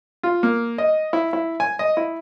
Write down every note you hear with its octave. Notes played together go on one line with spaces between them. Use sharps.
F4
A#3
D#5
E4
E4
G#5
D#5
E4